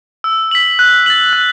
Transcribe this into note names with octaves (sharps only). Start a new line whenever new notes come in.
E6
B6 F#7
F#6
A6 F#7
F#6